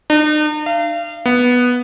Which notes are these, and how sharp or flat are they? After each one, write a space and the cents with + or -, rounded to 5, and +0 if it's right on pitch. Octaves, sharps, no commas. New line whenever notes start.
D#4 -45
F5 -30
B3 -5